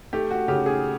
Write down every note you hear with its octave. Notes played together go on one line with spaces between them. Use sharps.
A3 G4
F#4
C#3 G4
G#4